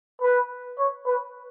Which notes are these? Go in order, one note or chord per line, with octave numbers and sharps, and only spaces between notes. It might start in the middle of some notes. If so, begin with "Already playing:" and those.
B4
C#5
B4